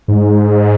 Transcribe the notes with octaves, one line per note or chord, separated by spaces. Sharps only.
G#2